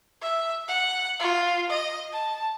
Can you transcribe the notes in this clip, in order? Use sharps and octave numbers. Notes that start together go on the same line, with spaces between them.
E5
F#5
F4
D#5
A5